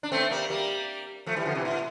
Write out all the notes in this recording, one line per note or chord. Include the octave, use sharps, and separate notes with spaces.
D4
A3 C4
G3 A#3
G3 A#3
F3 A3
E3 G3
D3 F3
C3 E3
A2